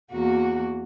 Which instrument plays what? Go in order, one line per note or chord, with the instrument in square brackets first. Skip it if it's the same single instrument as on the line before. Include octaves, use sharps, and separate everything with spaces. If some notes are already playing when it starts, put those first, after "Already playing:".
[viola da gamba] E2 A#3 F#4